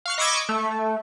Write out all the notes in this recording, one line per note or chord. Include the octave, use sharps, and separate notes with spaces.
F5 C#6 F#6
D#5 B5 C#6 D6 E6 G#6
A3